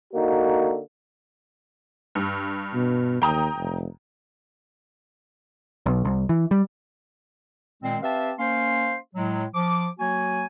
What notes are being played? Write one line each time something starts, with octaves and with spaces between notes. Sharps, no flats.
D3 A#3 D#4 F#4
G2
B2
D#2 G5 A#5 D#6
F1
B1
C2
E3
G3
A#2 D#3 G#3 C4
C4 G4 B4 E5 F5 A5
A#3 C#4 C5 F5 C6
A2 F#3 G#3
F3 D6
F#3 A#3 F#4 G#5